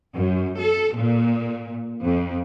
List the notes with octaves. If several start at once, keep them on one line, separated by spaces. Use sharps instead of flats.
F#2
A4
A#2
F2